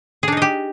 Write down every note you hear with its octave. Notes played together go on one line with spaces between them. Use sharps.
D4 D#4 G4 G#4 D#5